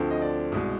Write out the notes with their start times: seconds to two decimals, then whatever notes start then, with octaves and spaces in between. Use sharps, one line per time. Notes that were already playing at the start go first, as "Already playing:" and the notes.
Already playing: D2 D3 F3 C4
0.10 D#5
0.22 D5
0.52 C2 B2 G#3